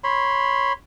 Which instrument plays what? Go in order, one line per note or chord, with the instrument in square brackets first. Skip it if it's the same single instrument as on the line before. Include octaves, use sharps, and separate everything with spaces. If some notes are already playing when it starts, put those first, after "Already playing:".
[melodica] C#5 B5 C6